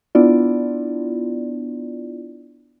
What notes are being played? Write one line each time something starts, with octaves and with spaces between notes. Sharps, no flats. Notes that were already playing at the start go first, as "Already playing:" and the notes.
B3 D4 E4 F4 D5